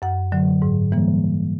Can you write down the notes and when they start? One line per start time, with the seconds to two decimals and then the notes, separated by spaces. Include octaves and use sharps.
0.02 F#2 F#5
0.32 D3 F#3
0.62 G#2
0.92 E3 G3 A#3